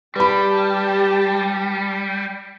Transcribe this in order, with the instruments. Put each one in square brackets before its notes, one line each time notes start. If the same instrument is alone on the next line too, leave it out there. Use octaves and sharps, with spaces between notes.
[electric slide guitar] G3 [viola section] G4 G5 A5 [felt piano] B4 B5